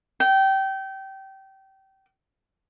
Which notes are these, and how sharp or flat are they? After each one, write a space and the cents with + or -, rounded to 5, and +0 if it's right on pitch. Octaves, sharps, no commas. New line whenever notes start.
G5 -25